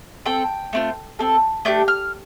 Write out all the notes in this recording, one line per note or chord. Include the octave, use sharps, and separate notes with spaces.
C4 A4 G5
A3 C4 F4
C4 A4
A3 D4 G4 G6
F6